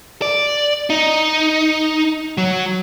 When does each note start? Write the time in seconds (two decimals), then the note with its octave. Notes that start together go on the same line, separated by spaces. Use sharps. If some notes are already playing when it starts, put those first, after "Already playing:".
0.22 D5
0.90 D#4
2.37 F#3